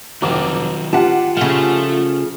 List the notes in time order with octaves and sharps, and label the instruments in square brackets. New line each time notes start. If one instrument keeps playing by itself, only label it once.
[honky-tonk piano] F1 D6 [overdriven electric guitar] D#3 F#3
[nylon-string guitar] F4 A5 [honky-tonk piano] G4 F#5
[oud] C#3 F3 [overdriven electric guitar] A3